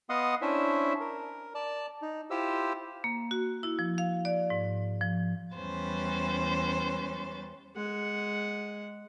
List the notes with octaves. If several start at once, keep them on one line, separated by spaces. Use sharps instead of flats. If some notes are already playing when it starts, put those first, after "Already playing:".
B3 D#5 F5 F#5 C6 D#6
C#4 D4 E4 C5 E5
A#4
D5 A5
D#4
E4 F4 G4 C5 E6
A#3
F#4
E4
F3
F5
D5
G#2
F3
E2 G3 C#4 B4 C5 A6
G#3 F#5